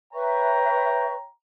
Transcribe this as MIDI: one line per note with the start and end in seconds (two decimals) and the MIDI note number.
0.14 1.13 71
0.14 1.28 73
0.14 1.13 76
0.14 1.28 79
0.14 1.28 82
0.14 1.13 85